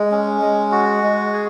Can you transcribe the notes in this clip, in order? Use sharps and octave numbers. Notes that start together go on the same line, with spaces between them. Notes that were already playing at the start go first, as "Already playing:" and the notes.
Already playing: G#3
C#4
G#3
F#4
G#3
G#4